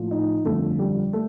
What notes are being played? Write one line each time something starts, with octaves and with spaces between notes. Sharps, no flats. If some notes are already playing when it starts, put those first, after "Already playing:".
Already playing: A#1 A2 F3
D#4
G1 F2 D3 F3 A3
G3
A3